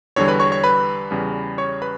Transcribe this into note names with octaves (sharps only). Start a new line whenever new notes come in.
E2 D3 G3 C#5
B4 B5
C#5 C#6
C#5 C#6
B4 B5
E2 C#3 G3
C#5 C#6
B4 B5